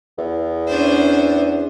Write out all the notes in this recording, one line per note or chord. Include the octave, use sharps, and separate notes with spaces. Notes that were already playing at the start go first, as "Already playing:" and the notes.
E2
C#4 D4 C5